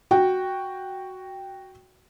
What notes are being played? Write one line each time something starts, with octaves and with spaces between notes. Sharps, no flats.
F#4 G5